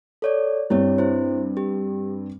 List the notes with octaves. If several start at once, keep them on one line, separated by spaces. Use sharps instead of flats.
A4 C#5 D5
G2 C4 D4 E4 G4 C#5
E4 C5
G4